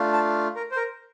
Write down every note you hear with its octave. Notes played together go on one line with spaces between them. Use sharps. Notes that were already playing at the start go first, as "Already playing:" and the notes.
Already playing: A3 D4 F4
A5
A#4
C5
A#4